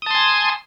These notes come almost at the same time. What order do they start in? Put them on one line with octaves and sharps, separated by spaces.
D#6 A5 C6 G#5